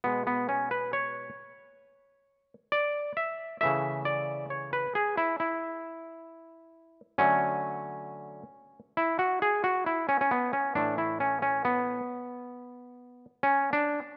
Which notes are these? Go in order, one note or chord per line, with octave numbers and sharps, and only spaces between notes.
B2 G#3 B3
B3
C#4
B4
C#5
D5
E5
C#3 E3 A3 E5
D5
C#5
B4
G#4
E4
E4
D3 F#3 A3 C#4
E4
F#4
G#4
F#4
E4
C#4
C#4
B3
C#4
A2 E3 A3 D4
E4
C#4
C#4
B3
C#4
D4